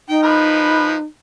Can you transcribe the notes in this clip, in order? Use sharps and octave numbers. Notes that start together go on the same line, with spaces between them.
D#4 G5
F3 B4 B5